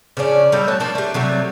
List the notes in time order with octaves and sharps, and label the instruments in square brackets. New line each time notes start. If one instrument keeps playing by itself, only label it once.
[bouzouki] C#3 F3 C#4 D4
G3 D#4 A4 E5
A3 F#4 C#5 A5
F3 A#3 D4 D#5
G3 A3
C3 F#3 G3 A3